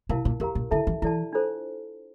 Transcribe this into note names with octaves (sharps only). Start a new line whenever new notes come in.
C3 E4 A#4 F5 A5
A#2
E2 G4 A#4 F5 A#5
A#2
D3 E4 A4 E5 A5
E3
E3 E4 A4 D5 A5
D4 F4 A4 C5